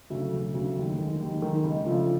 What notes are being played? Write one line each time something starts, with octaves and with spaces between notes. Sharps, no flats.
D2 C#3 F#3 A3
E1
D2 C#3 F#3 A3
D#2
D#3 G#3
D#2
D#3 G#3
C#2
C#3 F3 A3 D4